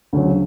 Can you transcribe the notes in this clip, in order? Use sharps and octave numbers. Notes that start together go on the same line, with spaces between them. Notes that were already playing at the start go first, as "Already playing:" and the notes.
D2 C#3 F#3